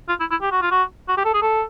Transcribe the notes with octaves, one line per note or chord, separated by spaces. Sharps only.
F4
E4
E4
G4
F#4
F4
F#4
F#4
G4
A4
G#4
A4